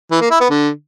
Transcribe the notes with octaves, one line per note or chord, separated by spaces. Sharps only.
E3
A#3
E4
B3
D3